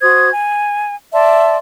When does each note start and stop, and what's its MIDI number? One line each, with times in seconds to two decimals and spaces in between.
0.01 0.30 66
0.01 0.30 72
0.01 0.30 87
0.01 0.30 92
0.31 0.94 80
1.13 1.56 74
1.13 1.56 76
1.13 1.56 81
1.13 1.56 84